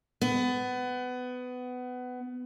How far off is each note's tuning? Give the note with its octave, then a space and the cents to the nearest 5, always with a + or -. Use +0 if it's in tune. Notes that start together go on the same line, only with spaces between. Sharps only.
B3 +20